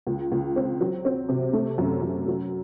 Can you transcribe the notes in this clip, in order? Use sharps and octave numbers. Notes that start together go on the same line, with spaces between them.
C#2
C#2
C4
F#3
C4
C3
A3
F#2
F#2
F#3